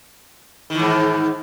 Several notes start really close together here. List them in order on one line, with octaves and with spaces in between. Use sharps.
D#3 E3 G#2